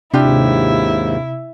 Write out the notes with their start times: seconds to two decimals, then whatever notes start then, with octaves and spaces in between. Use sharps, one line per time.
0.13 D#2 G#2 C3 D4 E4 F4 G4